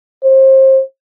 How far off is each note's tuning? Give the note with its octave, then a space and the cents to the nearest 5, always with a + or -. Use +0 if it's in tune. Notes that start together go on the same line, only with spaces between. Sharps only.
C5 +30